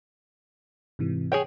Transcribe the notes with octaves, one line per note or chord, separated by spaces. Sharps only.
G#2 C3 E3
G#4 C#5 G5